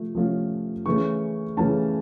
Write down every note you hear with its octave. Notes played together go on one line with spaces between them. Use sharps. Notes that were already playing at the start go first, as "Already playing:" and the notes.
Already playing: C3 F3 A3
C3 F3 A3 C#4 F4
C#3 E3 A3 C#4 C#6
C#3 E3 A3 C#4 A5